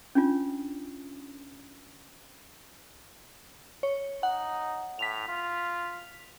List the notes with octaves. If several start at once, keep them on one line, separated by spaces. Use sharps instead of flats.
C#4 D4 F4
C#5
D#4 F#5
A2 B6 F7
F4